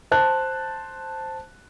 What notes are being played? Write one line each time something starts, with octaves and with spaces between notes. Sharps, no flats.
C5 A5 F#6